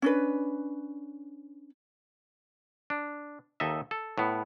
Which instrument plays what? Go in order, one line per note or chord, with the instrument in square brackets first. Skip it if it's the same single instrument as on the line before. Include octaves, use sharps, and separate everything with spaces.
[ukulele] C#4 D4 B4
[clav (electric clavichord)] D4
D#2 D#4 A4 D#5 E5
A4
A2 B3